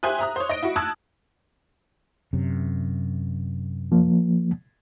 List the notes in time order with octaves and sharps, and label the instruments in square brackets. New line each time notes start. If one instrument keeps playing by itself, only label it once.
[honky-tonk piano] G4 C5 E5 G#5 D#6 F#6
E5 A#5 D#6
C5 C#5
D#5 A#6 D7
E4 F#4
A5 D#6 E6 F#6 G#6
[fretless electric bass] F#2 C3
[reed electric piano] F3 A#3